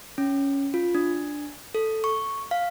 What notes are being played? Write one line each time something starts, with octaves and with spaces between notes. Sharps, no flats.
C#4
F4
D4
A4
C#6
F5